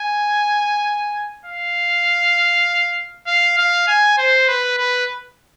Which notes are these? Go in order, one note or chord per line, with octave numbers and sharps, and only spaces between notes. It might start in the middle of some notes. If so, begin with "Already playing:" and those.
Already playing: G#5
F5
F5
F5
G#5
C5
B4
B4